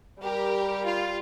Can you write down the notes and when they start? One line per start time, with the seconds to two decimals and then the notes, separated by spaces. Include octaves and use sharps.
0.22 G3 G4 A#4
0.83 F4